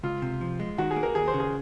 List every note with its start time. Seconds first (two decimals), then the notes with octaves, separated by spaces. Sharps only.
0.03 C#2 F4
0.22 C3
0.41 F3
0.60 G#3
0.78 D#3 F#4
0.91 G#4
0.96 A#3
1.03 A#4
1.15 D#2 G#4
1.28 C5
1.34 C#3
1.40 G#4